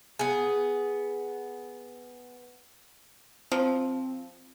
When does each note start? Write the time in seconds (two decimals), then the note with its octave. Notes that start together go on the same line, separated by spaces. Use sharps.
0.19 B3 G#4
3.52 F3 C4